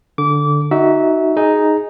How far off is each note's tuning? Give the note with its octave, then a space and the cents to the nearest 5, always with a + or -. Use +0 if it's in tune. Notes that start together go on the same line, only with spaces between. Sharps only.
D3 +0 D6 -25
D#4 +0 F#4 +10 E5 -20
D#4 +0 G#4 +0